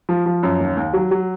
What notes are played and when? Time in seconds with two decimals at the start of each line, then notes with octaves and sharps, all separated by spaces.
0.09 F3
0.26 F3
0.43 F#2
0.60 D#2
0.77 D#2
0.93 F#3
1.11 F#3